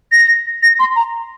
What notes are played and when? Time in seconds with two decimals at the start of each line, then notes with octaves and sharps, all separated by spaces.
0.12 A#6
0.63 A#6
0.79 C6
0.96 A#5